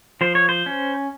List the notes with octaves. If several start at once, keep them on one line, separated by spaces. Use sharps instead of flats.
F3 C5
C#5
C5
C#4